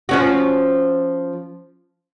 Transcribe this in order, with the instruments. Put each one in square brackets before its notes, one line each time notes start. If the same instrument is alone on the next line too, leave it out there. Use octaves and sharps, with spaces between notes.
[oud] F3 C#4 F#4